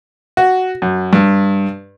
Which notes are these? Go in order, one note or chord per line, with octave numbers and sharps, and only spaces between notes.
F#4
F#2
G2